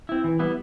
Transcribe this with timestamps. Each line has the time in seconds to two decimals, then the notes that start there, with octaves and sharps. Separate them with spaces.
0.09 C4 E4
0.24 E3
0.39 G3 B3 E4